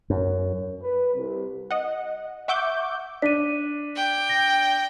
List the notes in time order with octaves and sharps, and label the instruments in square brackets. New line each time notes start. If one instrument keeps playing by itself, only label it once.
[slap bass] F#2
[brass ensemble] B4
C2
[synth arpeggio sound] D#5 F#5
E5 F#5 C#6 D6 E6 G6
[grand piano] D4 [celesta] B6 D#7
[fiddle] G5
[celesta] A#6